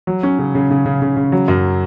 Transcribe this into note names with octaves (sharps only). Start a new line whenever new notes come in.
F#3
C#4
C#3
C#3
C#3
C#3
C#3
C#3
F#3
F#2